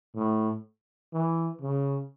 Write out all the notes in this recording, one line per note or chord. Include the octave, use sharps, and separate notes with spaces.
A2
E3
C#3